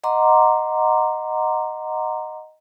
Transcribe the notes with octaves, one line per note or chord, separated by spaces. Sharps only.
D#5 F#5 A#5 C6 D6